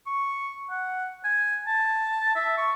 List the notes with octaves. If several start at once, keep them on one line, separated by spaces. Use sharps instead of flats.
C#6
F#5
G#5
A5
E5
C#6